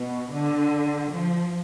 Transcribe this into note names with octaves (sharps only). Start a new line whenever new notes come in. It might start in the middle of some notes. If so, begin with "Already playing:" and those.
Already playing: B2
D3
F3